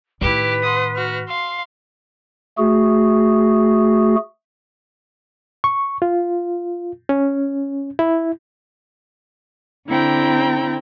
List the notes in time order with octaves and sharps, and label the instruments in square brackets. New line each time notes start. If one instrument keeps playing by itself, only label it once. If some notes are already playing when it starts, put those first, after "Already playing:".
[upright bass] A2 D#3 [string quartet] E4 G4 [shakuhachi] B4
[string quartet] F#5 C6 D#6
F#4 F6
F5 C6
[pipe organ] A3 F#4 G#4
[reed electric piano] C#6
F4
C#4
E4
[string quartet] D3 C4 E4 G5 A#5